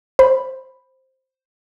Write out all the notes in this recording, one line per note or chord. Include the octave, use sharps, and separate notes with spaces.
C5 B5